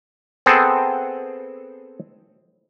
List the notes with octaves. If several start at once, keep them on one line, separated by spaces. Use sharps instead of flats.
B3 C4 G#4 A4